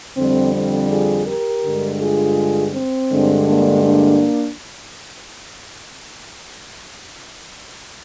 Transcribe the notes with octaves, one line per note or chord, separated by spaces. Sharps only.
F2 D3 G3 C4
C4
F4 G#4
G4 A#4
G2 D3 G#3
F4 G#4
C4
G2 D3 G#3
A#3 D4
A#3 D4